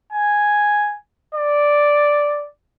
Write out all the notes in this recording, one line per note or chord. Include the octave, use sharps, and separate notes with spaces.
G#5
D5